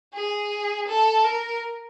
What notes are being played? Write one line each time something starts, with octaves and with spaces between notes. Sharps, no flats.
G#4
A4
A#4